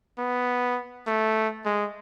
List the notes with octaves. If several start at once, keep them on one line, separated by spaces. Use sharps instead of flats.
B3
A3
G#3